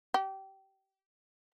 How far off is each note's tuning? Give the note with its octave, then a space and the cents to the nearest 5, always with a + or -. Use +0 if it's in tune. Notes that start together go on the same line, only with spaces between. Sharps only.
G4 -25